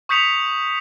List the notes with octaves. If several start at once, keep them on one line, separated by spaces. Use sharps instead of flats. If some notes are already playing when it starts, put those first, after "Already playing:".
C#6 D#6 G6 B6 C#7 F7